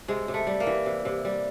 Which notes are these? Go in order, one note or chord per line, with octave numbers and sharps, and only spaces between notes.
C3 G#3
C3
A3
G3
A#3
E3
C3
C3
G3